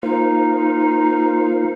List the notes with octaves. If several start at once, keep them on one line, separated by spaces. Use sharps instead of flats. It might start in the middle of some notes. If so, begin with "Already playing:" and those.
A#3 D#4 F4 C5